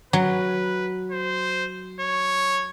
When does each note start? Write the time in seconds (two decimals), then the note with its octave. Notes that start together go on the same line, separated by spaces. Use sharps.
0.13 F#3 B4
1.12 C5
2.00 C#5